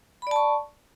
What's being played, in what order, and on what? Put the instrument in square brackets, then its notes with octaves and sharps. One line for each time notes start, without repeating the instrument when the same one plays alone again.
[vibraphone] B5
D5
A5
C#6